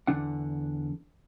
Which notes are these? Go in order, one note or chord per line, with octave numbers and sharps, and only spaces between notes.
E2 D3 D4 F#5